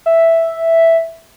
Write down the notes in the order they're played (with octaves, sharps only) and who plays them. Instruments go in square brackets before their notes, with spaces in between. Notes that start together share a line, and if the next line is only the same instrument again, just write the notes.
[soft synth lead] E5